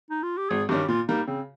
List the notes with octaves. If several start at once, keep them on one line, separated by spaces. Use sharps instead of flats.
D#4
F4
G4
G#1 G#4
G2 D#3 G3 C#4 G4
A#2 F4
G3 A#3 D#4
C#3 C4